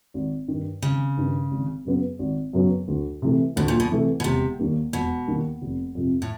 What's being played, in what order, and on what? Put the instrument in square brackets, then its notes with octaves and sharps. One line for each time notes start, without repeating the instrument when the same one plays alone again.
[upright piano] G#1
G2 D#3
[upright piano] G#1 [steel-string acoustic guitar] C#3
[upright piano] G2 D#3
G#1
F#2 C#3 F#3 B3
G#1
F#2 C#3 F#3 B3
D2
C3 E3 A3
[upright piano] D2 [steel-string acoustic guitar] A2
[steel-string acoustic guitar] A#2
B2
[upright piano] C3 E3 A3
[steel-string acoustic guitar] B2
[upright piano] E1 [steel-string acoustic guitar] C3
[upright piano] D#2 D#3 G3 A#3
[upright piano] E1 [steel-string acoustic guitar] B2
[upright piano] D#2 D#3 G3 A#3
F1
F2 C3
[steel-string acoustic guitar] A2